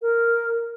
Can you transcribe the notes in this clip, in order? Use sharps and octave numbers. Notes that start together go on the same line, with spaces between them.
A#4